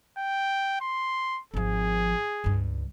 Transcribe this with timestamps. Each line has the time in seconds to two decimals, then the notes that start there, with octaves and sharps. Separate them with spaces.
0.18 G5
0.81 C6
1.54 G#1 F3 G#4
2.44 C#2 G2